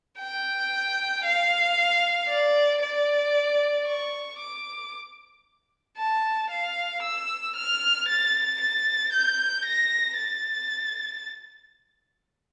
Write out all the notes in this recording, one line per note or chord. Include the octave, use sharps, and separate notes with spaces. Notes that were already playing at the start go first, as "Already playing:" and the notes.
G5
F5
D5
D5
C#6
D6
A5
F5
E6
F6
A6
A6
G6
A#6
A6